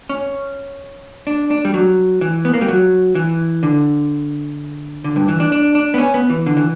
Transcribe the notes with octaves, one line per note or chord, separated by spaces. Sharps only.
C#4
D4
D4
G3
F#3
E3
B3
A#3
G3
F#3
E3
D3
D3
G2
E3
D4
D4
D4
B3
C#4
B3
E3
D3
E3